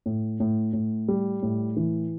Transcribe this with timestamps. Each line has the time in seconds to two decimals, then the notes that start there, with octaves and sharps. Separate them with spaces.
0.06 A2
0.40 A2
0.73 A2
1.08 G3
1.42 A2
1.76 E3